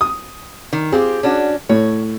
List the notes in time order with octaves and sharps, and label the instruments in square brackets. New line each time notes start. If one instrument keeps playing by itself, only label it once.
[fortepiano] D#6
[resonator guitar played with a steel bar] D#3
[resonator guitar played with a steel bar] C4 F4 G4 [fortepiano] G#4
[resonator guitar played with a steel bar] C#4 D4 F#4
[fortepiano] A2 [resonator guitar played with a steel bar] C#5